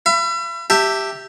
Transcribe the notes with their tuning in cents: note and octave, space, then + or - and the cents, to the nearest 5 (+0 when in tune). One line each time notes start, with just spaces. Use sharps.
E5 +45 B5 +20
G4 +0 E5 +0 A5 +30